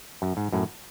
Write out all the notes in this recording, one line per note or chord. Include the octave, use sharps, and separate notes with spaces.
F#2
G#2
F#2 A2